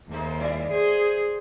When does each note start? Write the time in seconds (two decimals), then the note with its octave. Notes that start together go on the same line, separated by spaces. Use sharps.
0.11 D#2 G#3 C4 D#4
0.40 G3 E4 D5
0.74 G#4 C5